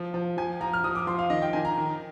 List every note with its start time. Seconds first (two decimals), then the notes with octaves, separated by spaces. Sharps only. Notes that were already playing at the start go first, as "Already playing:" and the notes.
Already playing: F3
0.14 F3
0.37 F3 G#5
0.61 F3 A#5
0.73 F6
0.84 F3 D#6
0.95 D6
1.07 F3 C6
1.18 F5
1.30 D#3 D#5
1.42 G5
1.53 D#3 G#5
1.65 A#5
1.77 D#3